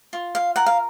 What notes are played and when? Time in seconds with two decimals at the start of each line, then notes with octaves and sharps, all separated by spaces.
0.13 F4
0.35 F5
0.56 A#4 F#5
0.66 F5